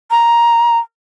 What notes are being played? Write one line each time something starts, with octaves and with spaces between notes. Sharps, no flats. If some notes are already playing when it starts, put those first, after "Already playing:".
A#5